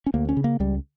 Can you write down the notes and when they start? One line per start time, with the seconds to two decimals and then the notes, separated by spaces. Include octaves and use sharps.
0.06 C#4
0.14 D2 A#3
0.29 C#4
0.37 C#3
0.44 A#3
0.60 C#2 G3